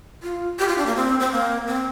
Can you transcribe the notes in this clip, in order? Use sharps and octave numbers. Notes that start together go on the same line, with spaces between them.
F4
G4
F4
D4
A#3
C4
C4
A#3
C4